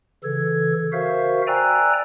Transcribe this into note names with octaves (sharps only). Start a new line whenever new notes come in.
C#3 E3 A4 G#6
F#4 A#4 C5 E5 F5
D5 G5 G#5 A#5 E6 F#6